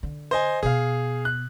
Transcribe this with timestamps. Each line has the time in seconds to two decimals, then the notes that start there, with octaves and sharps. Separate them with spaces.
0.03 D3
0.31 C5 D#5 G#5
0.63 B2 B3 G#4 F5
1.25 F#6